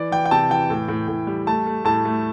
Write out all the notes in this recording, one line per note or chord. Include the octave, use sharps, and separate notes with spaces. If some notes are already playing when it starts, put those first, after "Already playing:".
Already playing: E3 D5
E3 G5
G5
C3 A5
E3 G5
A2
A2
A2
G3
A3 A5
A3
A2 A5
A3